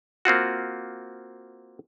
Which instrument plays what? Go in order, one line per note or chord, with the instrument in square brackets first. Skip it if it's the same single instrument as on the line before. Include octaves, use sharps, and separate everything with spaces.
[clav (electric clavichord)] A#3 C4 F4 F#4